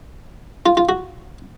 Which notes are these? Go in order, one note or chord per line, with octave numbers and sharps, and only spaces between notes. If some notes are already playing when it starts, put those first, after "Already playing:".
F4
F4
F#4